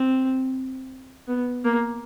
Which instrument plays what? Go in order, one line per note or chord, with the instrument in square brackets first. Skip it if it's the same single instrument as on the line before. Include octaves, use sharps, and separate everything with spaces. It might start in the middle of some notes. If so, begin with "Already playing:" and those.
Already playing: [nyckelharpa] C4
B3
A#3